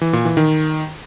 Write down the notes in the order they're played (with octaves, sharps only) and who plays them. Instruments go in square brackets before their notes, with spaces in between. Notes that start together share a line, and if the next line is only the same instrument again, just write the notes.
[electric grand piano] E3
A#2
E3
D#3